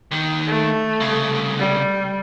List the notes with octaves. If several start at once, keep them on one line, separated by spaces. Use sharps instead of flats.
D#2 D#3
A3
C2 C#3
G3